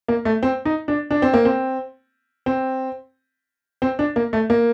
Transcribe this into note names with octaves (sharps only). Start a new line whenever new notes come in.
A#3
A3
C4
D#4
D4
D4
C4
A#3
C4
C4
C4
D4
A#3
A3
A#3